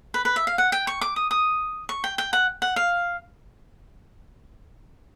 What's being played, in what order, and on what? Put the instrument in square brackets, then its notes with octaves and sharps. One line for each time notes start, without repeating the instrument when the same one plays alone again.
[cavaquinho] B4
B4
E5
F5
F#5
G5
C#6
D6
D#6
D#6
C#6
G5
G5
F#5
F#5
F5